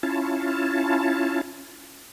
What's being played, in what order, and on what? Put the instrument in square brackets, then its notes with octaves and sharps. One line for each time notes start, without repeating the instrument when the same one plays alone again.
[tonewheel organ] C#4 E4 F4 A5